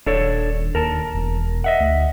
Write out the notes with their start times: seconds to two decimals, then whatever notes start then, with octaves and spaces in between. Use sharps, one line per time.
0.06 D#1 D4 A4 C#5
0.75 D#2 A#4 A5
1.15 E1
1.64 D#5 E5 F#5
1.80 D2